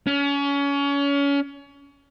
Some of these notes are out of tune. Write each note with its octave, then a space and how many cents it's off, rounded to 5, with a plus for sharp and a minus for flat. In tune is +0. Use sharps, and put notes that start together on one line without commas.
C#4 +30